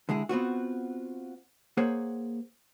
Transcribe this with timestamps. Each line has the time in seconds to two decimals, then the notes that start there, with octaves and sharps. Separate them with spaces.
0.09 D3 G#3 E4 G#4
0.29 B3 C4 F4 F#4
1.77 A#3 G#4 C5 C#5 F#5